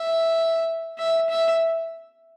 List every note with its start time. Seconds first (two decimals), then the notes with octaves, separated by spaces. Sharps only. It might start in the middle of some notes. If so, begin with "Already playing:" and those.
Already playing: E5
0.98 E5
1.30 E5